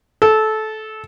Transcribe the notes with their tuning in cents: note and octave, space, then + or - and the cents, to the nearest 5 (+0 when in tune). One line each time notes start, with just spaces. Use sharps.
A4 -20